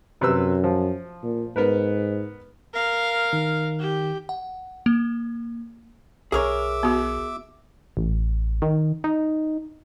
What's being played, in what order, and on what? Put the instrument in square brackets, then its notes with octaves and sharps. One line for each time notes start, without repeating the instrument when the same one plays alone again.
[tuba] F#2 [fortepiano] C3 B4 E6
[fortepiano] F3
[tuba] A#2
[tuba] G#2 [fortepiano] B3 A#4 B4
[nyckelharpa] A#4 F5
[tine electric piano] D#3
[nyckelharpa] G4
[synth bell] F#5
A#3
[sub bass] B1 [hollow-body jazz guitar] G#4 A#4 C#5 [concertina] E5 D6
[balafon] B3 F#4
[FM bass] A1
D#3
D#4